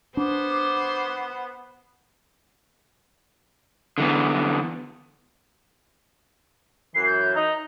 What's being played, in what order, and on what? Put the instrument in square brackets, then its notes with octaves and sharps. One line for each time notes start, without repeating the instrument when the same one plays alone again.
[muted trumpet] B3 [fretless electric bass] D4 [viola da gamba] C5 [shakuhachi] D6
[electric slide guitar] D3 E3 B3
[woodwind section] F#2 E3 [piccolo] C7
[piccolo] G6
[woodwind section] D#4 [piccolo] A#5